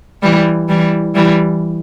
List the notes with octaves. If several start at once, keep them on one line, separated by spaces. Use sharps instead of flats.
E3 G3
E3 G3
E3 G3